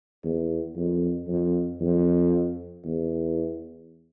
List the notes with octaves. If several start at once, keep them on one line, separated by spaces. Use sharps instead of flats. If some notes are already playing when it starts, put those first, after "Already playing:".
E2
F2
F2
F2
E2